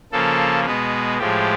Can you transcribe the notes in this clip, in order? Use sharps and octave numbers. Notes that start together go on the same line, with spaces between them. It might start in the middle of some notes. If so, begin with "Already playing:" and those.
C#3 F3 A#3 A4
B2 G#3 B3 B4
A2 F3 G#3 G4